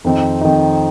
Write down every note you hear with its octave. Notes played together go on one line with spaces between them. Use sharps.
F2 D#3 C4 D#4
F2 D#3 C4 D#4